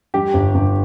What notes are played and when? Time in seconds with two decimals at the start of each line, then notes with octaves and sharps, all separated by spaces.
0.14 G3 G4
0.34 G1
0.55 G1